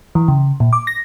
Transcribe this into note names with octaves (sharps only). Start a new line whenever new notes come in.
E3
C#3
A#2
D6
A#6